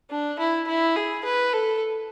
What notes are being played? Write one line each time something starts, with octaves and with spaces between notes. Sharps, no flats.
D4
E4
E4
G#4
B4
A4